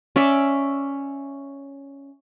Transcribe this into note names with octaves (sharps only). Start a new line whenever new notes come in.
C#4 D5 E5 D6